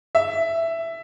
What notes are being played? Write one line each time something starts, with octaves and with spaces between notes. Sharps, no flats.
E5